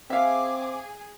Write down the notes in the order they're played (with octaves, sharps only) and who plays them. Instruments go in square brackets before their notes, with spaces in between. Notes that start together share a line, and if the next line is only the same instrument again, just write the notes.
[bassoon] C4 [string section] G#4 [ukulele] E5 F5 [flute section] D6